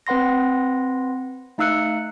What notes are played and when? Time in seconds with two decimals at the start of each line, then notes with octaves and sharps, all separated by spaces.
0.07 C4 B4 F#5 C6 A#6
1.58 A3 D#4 F5 E6 F#6 C#7